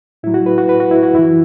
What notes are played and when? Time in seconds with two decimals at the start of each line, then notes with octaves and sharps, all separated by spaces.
0.23 A2 F#3 E4
0.34 F#4
0.46 B4
0.58 F#4
0.69 B4
0.80 F#4
0.91 E4
1.03 F#4
1.14 F#2 E3 E4